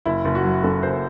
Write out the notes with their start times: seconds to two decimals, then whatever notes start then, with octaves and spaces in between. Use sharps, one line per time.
0.06 F#1 E4
0.25 F#1
0.35 F#4
0.44 F#3
0.63 F#2 A4
0.83 F#1 C5